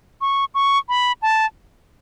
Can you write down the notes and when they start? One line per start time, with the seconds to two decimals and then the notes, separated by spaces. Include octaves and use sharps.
0.21 C#6
0.55 C#6
0.89 B5
1.22 A5